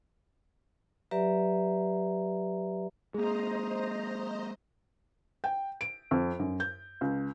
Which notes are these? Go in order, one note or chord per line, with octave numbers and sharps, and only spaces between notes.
F#3 G4 B4 D5 E5 A#5
G#3 A#3 G#4 C5 D#5 A#5
G5
D7
F2
F#2
G6
C#2